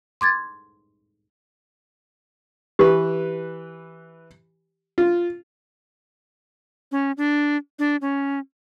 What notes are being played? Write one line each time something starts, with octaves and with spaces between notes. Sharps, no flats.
C6 D6 G#6 A6
E3 G4 B4
F4
C#4
D4
D4
C#4